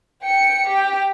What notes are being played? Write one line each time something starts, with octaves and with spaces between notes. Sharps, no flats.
G5 C#7
G4 G5